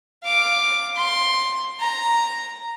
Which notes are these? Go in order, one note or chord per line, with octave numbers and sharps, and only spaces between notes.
F5 D6
C6
A#5